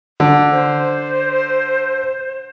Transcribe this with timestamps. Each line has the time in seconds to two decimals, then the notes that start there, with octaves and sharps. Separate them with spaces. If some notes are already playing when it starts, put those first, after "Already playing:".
0.20 D3
0.52 C5